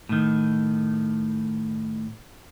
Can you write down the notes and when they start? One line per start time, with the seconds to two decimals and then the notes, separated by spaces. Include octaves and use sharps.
0.09 A2 D#3